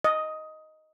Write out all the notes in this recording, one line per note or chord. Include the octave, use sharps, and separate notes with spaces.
D#5